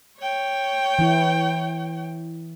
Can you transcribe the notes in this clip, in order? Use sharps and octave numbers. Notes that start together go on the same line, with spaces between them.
C#5 G5
E3 E4